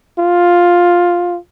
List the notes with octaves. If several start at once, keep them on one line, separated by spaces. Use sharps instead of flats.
F4